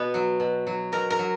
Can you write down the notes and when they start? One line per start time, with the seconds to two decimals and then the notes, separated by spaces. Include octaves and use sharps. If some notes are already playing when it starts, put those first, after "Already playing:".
Already playing: B2 B3
0.14 F#3
0.40 B2
0.67 F#3
0.92 B2 A#4
1.10 A#4
1.19 F#3